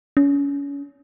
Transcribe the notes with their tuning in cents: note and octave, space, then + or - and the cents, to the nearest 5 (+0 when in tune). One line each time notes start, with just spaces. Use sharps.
C#4 +30